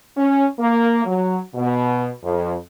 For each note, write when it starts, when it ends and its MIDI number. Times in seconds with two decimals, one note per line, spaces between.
0.17 0.45 61
0.59 1.01 58
1.05 1.39 54
1.55 2.09 47
2.23 2.55 41